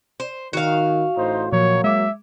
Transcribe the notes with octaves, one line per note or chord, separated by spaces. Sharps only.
C5
D#3 F#4 F5
A1 A2 D#4 C5
A#2 F3 F#3 A#3 C#5
G#3 E5 D6